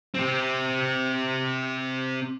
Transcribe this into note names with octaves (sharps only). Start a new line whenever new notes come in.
C4 G4